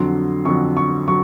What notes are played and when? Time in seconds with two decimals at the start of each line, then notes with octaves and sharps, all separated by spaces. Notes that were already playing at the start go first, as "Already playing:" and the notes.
Already playing: F2 D3 F#3 C6
0.45 F2 D3 F#3 C#6
0.77 C#6
1.08 F#3 C#6